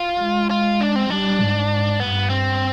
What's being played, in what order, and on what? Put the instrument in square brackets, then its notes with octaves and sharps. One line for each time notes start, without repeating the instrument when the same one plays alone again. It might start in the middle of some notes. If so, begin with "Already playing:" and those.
Already playing: [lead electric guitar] F4
[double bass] G#3
[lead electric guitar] F4
D4
C4
[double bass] G3 [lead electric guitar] D4
[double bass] G#2
[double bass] G2 [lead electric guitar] B3
[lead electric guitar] C4